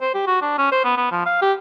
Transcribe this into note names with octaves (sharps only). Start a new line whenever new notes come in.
C5
G4
F#4
D4
C#4
C5
B3
B3
F3
F5
G4